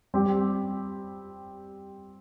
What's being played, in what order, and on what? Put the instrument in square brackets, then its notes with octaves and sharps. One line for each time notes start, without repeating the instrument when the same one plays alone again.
[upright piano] G3 C4 G4